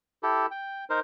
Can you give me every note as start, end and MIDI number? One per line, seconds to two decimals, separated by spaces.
0.23 0.46 64
0.23 0.46 67
0.23 0.46 69
0.51 0.85 79
0.90 1.00 63
0.90 1.00 70
0.90 1.00 72